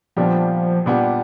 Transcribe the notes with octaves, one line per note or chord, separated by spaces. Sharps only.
A#2 F3 G3 B3 D4 G4
A#2 G3 B3 D4 G4